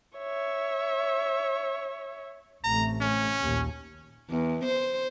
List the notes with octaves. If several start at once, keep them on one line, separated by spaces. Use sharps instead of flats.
C#5 E5
A1 C3 A3 A#5
C#4
A#1 D#2
E2
C5